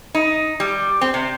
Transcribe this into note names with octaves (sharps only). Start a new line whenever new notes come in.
D#4
G3
C4
C3